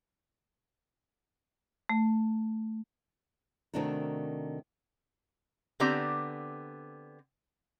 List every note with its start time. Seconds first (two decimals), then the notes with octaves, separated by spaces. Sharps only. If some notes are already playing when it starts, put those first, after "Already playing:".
1.89 A3
3.74 C3 D#3 A3 D4 F#4 A#4
5.80 D3 B3 C4 G4 D5 A#5